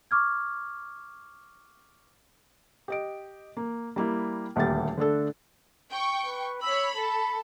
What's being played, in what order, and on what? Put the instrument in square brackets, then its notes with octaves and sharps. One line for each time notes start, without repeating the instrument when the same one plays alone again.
[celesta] C#6 D6 F6 G#6
[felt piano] G4 D#5 D7
A#3
G3 A#3 E4
D#1 D2 A#3 G4 A6
D3 A3 D4 A4
[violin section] G5 C#6
[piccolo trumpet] B4
[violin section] C#5 B5 [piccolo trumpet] E6
[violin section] A4 [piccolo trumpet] B5